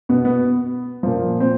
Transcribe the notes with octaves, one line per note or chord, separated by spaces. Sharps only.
B2 B3
B3
A#2 F3
C4